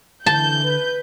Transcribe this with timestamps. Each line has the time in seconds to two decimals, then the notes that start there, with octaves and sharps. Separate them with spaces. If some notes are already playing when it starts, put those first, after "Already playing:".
0.26 D3 E3 A5 G6
0.64 B4